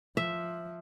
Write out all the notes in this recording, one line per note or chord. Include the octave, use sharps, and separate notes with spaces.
F3 E5